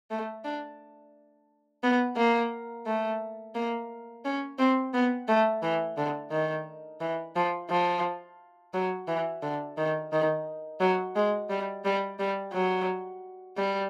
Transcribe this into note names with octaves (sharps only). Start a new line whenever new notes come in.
A3
D4
B3
A#3
A3
A#3
C#4
C4
B3
A3
E3
D3
D#3
E3
F3
F3
F#3
E3
D3
D#3
D#3
F#3
G#3
G3
G3
G3
F#3
G3